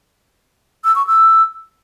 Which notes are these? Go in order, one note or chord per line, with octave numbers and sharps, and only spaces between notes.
E6
C#6
E6